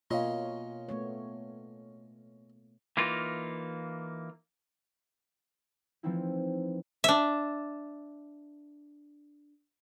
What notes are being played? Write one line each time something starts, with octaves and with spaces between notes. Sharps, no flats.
B2 A#3 C#4 F4 C#5 D#5 F5 C6
A3 B3 C#5
E3 A#3 D#4 F4
E3 F3 A3 C4 D#4 E4
D4 E5